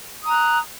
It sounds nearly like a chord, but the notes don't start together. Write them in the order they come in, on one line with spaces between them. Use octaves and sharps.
D#6 A#5 F#6